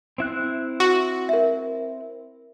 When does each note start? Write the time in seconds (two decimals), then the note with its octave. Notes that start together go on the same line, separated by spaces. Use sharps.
0.18 C4 E4 F#6
0.80 F#4
1.29 A#4 E5